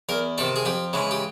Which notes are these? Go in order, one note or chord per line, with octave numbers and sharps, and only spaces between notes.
E2 A#4
C3 D#3 A4
G#4
F2 G4
C#3 E3 G#3
G4